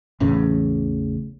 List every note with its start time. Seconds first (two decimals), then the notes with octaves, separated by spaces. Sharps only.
0.20 A1 E2 A2 C#3